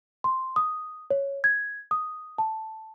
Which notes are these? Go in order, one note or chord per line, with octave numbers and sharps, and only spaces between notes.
C6
D#6
C#5
G#6
D#6
A5